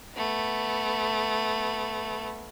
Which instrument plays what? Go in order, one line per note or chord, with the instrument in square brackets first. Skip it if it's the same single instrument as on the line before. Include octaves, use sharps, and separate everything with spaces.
[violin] A3 B3